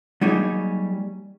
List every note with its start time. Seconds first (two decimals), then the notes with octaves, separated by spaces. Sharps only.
0.21 F#3 G3 A#3 D#4 G#4 C#5